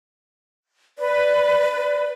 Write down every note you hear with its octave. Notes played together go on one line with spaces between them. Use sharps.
B4 D5